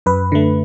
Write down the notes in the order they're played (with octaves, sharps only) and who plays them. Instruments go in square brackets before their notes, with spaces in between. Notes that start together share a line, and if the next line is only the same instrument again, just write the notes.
[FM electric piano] F#2 B4
D3 A3